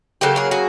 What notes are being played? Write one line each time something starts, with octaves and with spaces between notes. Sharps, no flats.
C#3 F#3 A#3 G4 A4
G#4 A#4
F#4 G#4